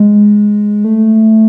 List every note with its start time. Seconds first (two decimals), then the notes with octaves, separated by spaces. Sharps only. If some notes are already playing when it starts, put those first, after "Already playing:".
Already playing: G#3
0.84 A3